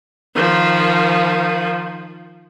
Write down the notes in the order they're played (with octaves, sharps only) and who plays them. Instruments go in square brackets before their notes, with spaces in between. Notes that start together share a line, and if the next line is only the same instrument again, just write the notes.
[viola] D#3 F3